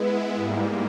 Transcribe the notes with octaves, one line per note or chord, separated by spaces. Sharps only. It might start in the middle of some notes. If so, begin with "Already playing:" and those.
Already playing: G#3 B3 E4
G#2 G3 A#3